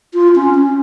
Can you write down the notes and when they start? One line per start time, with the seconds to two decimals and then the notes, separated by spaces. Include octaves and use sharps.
0.14 F4
0.35 C#4
0.55 C#4